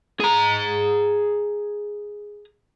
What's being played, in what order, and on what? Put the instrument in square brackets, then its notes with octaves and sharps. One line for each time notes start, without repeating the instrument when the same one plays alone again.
[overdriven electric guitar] G#4 A#5